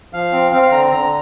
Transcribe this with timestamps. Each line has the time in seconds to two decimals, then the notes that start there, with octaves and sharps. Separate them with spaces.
0.13 F3 F5
0.32 C4
0.52 C4 F5
0.62 F5
0.71 D3 A#5
0.92 D3 A#5